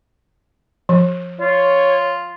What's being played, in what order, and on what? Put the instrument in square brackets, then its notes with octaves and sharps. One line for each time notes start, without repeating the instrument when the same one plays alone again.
[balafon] F3
[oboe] F4 [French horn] C#5